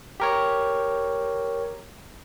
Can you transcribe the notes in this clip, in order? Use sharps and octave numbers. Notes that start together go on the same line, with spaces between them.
G4 A#4 C#5